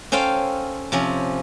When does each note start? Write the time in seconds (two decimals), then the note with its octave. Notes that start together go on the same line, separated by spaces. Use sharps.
0.12 C#4 A4 C5 F5 G5
0.92 C3 F3 C#4